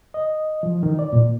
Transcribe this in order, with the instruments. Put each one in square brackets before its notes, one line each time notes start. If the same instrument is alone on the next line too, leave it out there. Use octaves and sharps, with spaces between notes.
[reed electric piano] D#5
F3
D#3
D5
A#2